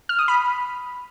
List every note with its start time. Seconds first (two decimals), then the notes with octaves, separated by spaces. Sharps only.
0.09 F6
0.19 D#6
0.28 B5